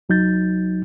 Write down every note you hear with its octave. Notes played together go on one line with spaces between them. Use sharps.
C2 F#3 D#4 G6 A6